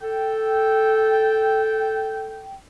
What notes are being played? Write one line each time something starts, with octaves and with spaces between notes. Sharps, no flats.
A4 G5